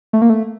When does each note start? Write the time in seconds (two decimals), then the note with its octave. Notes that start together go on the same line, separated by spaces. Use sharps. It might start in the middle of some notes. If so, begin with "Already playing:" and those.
0.13 A3
0.22 A#3
0.30 A3